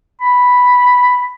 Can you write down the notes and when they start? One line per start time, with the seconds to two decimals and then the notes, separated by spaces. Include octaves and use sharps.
0.21 B5